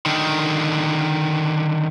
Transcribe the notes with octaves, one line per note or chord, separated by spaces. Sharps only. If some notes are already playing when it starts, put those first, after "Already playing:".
D3 D#3